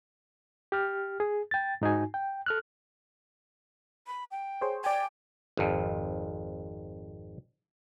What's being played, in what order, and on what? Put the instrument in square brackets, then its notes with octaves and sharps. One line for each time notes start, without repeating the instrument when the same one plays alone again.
[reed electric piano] G4 F6
G#4
G5 A6
G#2 D#4 F#4 G#5
G5
A4 F6 F#6
[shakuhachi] B5
G5
[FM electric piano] G#4 C5 C#5
[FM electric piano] D5 G#5 [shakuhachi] G5
[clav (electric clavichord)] G#1 F2